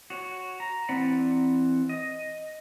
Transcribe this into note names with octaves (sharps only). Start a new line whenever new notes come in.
F#4 C#5
A#5
E3 C4 D5 F#5 B5
D#5